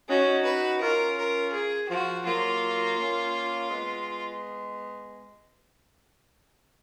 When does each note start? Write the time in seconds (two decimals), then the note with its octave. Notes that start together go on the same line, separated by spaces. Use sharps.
0.08 C#4 D#4 F#4
0.45 B4
0.81 C#4 F4 A#4
1.18 A#4
1.53 G#4
1.89 F3 F#4
2.25 F#3 A#3 F4
2.97 A#3 C#4
3.70 G#3 B3